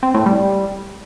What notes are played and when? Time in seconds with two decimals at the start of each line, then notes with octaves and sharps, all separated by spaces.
0.03 C4
0.14 A2
0.26 G3